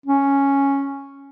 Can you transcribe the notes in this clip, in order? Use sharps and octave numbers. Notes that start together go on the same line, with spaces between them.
C#4